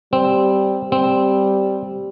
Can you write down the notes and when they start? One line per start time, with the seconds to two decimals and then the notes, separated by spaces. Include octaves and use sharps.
0.13 G3 C4
0.92 G3 C4